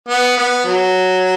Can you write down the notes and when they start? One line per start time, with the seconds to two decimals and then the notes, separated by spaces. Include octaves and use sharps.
0.09 B3
0.37 B3
0.66 F#3